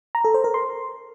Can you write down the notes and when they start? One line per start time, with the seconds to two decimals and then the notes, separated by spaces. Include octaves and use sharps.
0.15 A#5
0.25 A4
0.34 C5
0.44 A#4
0.54 C6